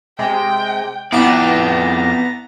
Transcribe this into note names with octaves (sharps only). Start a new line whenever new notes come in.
C3 G#3 G5
C2 F2 B3 D5 G5 A#5 A6